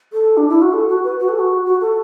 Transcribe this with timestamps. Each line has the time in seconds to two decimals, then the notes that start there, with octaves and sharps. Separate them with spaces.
0.13 A4
0.37 D4
0.49 E4
0.62 F#4
0.73 A4
0.89 F#4
1.04 B4
1.19 F#4
1.29 A4
1.39 F#4
1.65 F#4
1.81 A4